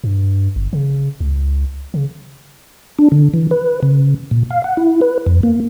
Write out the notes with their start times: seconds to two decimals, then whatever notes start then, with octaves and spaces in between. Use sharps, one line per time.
0.04 G2
0.56 G1
0.73 C#3
1.20 C#2
1.94 C#3
2.99 D4
3.12 D3
3.34 E3
3.51 B4
3.83 C#3
4.31 A#2
4.51 F5
4.64 F#5
4.77 E4
5.01 B4
5.26 F2
5.43 A#3